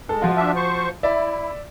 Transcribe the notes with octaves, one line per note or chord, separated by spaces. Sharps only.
G#3 A4
F3 F4 F#4
D4 E5
C5 C#6
E4 D5 E5